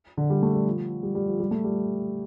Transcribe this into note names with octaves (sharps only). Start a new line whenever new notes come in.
D3
G3
A3
G3
F3
G3
G3
F3
G3
A3
G3